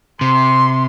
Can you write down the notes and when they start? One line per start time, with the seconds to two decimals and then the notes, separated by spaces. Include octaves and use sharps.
0.21 C3 C6